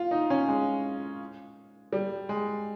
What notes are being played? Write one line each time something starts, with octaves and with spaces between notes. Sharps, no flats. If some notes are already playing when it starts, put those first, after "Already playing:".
Already playing: F4
D#4
C#4
G#3
G3
G#3